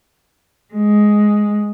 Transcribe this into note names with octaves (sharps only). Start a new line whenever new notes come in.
G#3